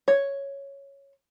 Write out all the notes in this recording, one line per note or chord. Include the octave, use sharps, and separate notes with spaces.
C#5